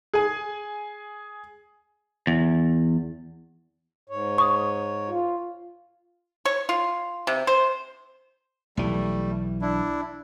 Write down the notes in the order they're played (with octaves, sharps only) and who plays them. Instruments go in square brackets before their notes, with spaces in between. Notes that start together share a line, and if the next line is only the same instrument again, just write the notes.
[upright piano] G#4 G#5
[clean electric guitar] E2
[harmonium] G#2 C#5
[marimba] C#6 D#6
[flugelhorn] F4
[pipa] C#5
F4
C3
C5
[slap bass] B1 E3 [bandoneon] G3 A3
[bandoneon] D4 E4